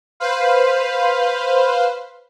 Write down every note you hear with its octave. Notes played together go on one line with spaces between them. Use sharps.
B4 C5 F5